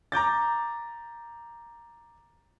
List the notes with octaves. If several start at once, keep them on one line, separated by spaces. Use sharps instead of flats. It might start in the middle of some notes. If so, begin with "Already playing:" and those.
A#5 D6 G6 A6